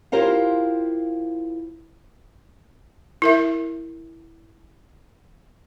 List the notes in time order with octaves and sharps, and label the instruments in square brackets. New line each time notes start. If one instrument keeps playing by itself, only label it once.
[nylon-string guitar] E4 F4 G4 A#4 C5 F5
[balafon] E4 A#4 E5